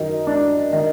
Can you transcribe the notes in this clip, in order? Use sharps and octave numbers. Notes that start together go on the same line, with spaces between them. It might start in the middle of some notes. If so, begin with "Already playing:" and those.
Already playing: F#2 D#3 D#4
D4
D#3